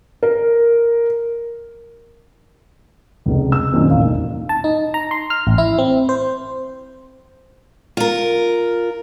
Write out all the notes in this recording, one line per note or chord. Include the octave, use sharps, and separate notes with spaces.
A#4
F1 C#2
E6
F#2 A#2 D#3 C4
D#1 A1 F5
E1 D#4
A5
D#4
A#5
C6
F6
A1
E4
C4
C5
F4 A#4